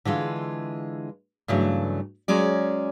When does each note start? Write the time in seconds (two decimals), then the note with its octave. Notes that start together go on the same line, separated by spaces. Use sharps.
0.05 D3 E3 G#3 F4
1.48 G2 C#3 E3 F#3 A3
2.28 F#3 G#3 C#4 D5